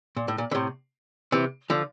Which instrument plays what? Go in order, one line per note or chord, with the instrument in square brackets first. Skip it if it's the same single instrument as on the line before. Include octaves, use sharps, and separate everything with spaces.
[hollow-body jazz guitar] A#2
A2
A#2
D3
A2 C3
C3 E3
D3 F3